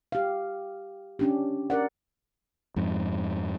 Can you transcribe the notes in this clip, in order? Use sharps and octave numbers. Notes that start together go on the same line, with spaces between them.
G4 F5
C#4 D4 G4
C#4 A#4 D5 F#5
F2 G#2